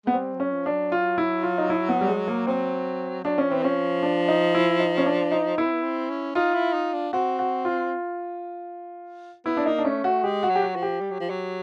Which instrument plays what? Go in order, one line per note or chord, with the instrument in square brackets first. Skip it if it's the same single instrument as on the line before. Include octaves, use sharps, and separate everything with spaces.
[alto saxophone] G#3 [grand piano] B3
[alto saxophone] G3 [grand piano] C4
[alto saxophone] F#3
[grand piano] C#4
[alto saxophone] F3
[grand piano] D4
[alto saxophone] F#3
[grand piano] F4
E4
F4
D#4
E4
B3
G3
G#3
A#3
[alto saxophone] F#3 [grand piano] C4
[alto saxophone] F#3 [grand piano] D4
[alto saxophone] F3 [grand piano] C#4
[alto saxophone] E3 [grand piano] C4
[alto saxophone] F3 [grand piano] C#4
[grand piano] D4
D#4
E4
D#4
C#4
D4
D#4
[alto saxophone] B3 [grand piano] E4
[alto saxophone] C4
B3
C4
C#4
[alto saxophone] D#4 [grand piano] F4
[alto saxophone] E4
D#4
D4
[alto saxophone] C4 [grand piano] F#4
[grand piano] F#4
F4
[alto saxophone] B3 [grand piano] E4
[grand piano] D4
[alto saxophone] A#3 [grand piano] D#4
[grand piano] D4
[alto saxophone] A3 [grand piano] C#4
[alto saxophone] A3 [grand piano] F#4
[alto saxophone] G#3 [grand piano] G4
[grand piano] F#4
[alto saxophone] F#3
[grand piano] G4
F#4
[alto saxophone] F3
[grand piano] G4
[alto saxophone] G3
F#3
F3
F#3